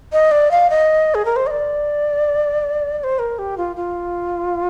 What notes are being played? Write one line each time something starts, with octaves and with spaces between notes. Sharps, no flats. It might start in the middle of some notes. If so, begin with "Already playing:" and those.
D#5
D5
F5
D#5
G#4
A#4
C5
D#5
D5
D5
C5
A#4
G4
F4
F4